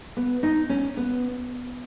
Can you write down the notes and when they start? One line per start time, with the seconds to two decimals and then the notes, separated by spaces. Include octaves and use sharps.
0.17 B3
0.43 D#4
0.69 C#4
0.97 B3